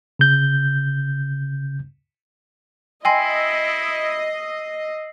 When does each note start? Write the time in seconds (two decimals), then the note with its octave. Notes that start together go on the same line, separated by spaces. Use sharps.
0.19 C#3 G6
3.05 E4 D#5 G5 G#5 C6 E6 A#6 C7